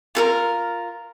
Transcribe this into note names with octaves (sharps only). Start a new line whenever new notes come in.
F4 A4 A#4